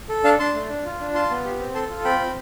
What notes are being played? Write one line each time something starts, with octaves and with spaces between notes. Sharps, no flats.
A4
D4 F5 A5
D4 A5 C6
A3
D4
F4
D4
F4 A5 C6
B3
G4
C4
A4 A5 C6
F4
C4 G5 B5
C4